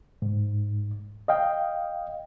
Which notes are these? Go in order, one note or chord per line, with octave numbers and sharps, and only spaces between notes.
G#2
D#5 F5 G5